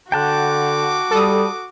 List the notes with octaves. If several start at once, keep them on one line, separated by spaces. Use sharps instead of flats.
D3 F#4 G5 A5 D6 F#6
G3 A4 D#6